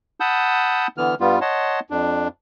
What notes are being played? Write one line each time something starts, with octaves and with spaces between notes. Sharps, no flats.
F#5 A5 B5 D#6 E6 G6
D3 E3 B3 F6
G2 G3 B3 F4
C#5 D#5 F#5 A5 C6
F2 D4